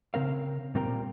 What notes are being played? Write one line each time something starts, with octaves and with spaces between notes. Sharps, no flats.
C#3 C4 A#4 F5
A#2 G3 C4 A#4 G5 A#5